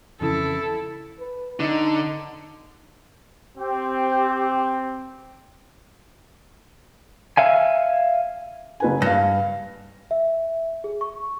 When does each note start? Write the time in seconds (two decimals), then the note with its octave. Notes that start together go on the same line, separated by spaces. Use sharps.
0.21 F2 C#3 E3 E4 A4
1.19 B4
1.60 D3 D#4
3.57 C4 G4
7.37 E5 F5 G#5
8.80 F#1 B4 G#5
9.02 G2 F5 A#6
10.11 E5
10.84 G#4
11.01 C#6